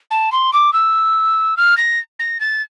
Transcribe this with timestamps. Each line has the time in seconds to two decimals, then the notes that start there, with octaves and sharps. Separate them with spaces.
0.11 A5
0.32 C6
0.53 D6
0.73 E6
1.57 F6
1.77 A#6
2.19 A#6
2.40 A6